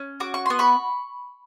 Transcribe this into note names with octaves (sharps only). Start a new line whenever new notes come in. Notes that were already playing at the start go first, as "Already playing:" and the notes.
Already playing: C#4
F#4 D6
C#6
B3 C6
B5 C#6